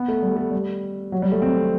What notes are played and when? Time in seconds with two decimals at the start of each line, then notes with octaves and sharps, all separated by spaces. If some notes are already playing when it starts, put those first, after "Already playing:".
Already playing: B3
0.08 A3
0.23 G3
0.36 A3
0.51 G3
1.12 F#3
1.22 G3
1.32 A3
1.42 C4